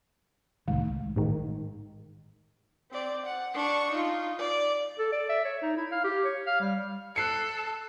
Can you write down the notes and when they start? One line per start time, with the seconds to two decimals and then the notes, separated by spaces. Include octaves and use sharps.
0.68 C2 A2 D#3 G#3
1.16 A1 G#2 D#3
2.91 C4 D5
3.25 F#5
3.55 D4 C#6
3.91 D#4 F4
4.38 D5
4.99 A4
5.12 D5
5.29 E5
5.45 C#5
5.62 D#4
5.77 E4
5.91 F5
6.04 G4
6.25 C#5
6.47 F5
6.60 G3
7.16 A4 F#6 C7 C#7